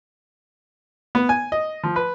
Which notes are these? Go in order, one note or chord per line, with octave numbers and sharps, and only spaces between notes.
B3
G#5
D#5
F3
B4